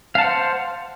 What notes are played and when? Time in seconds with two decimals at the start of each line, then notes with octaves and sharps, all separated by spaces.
0.15 F5
0.18 A5
0.21 F#5
0.24 C5